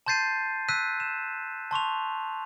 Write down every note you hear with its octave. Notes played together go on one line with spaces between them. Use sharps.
A5 C6 G6 A6 C7 D#7
E6 F#6 B6 D#7
E7
A5 C6 C#6 F7